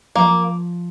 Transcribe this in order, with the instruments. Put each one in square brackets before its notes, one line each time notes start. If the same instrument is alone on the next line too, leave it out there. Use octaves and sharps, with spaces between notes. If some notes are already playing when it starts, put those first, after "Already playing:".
[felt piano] F3 [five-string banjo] A#3